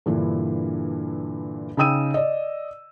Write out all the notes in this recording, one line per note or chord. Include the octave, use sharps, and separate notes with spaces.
G2 A#2 D3 E3
C#3 D#4 G5 D#6 E6 D#7
D5 D#5